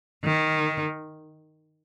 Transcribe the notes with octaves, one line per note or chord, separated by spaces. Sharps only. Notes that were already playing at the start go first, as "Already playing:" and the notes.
D#3